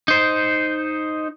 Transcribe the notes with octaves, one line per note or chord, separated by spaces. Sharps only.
D#4 C5